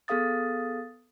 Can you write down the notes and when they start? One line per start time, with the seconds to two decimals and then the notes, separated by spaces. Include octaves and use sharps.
0.08 B3 G#4 A4 F5 D#6 A6